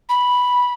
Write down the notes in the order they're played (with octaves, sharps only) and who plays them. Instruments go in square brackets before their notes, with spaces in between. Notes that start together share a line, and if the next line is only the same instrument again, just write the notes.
[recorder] B5